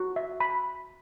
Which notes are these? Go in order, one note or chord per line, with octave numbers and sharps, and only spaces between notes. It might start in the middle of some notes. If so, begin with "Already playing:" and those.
Already playing: F#4
E5
B5